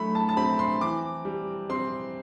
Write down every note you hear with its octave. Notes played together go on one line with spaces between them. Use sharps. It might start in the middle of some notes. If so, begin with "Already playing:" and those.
Already playing: F#3 A3 B5
A5
A5
C4 B5
C6
E3 D6
G3
C4 C6